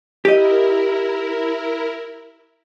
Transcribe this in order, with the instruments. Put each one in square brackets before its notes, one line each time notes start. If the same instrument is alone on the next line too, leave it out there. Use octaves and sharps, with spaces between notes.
[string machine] E4 A#4 [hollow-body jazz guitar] G4 D#5